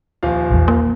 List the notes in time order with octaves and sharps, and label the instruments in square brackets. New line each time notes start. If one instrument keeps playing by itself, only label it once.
[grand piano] D#1 F3 F5
[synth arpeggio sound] A#1 E2
[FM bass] A#3